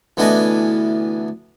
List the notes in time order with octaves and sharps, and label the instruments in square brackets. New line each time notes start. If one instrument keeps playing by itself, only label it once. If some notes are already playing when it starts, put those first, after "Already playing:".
[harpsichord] D2 E3 B3 D4 D#5 G#5